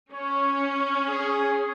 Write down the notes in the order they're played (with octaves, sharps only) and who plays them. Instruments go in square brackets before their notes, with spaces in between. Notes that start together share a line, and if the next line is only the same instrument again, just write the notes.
[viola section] C#4 [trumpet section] C#5
[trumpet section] G#4